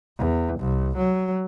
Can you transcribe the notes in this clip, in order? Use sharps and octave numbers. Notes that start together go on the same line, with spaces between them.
E2
C2
F#3